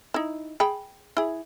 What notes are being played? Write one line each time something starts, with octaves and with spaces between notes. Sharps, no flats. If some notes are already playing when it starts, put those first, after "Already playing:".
D#4 E4
G#4 G5 B5
E4 G#4